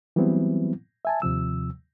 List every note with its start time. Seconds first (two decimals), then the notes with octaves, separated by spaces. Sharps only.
0.16 E3 F#3 G3 B3 C4 E4
1.05 E5 G#5 A5
1.22 D#2 C3 F3 E6